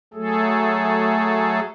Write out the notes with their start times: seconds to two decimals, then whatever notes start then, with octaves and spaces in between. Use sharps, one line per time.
0.14 F#3 A3 G#4 A4